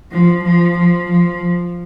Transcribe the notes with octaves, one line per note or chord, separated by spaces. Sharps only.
F3
F3
F3
F3